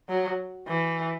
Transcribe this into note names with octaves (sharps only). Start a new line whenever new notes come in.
F#3
E3